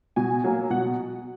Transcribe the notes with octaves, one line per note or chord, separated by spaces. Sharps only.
B2 G#5
F#3 A#3
B2 F#5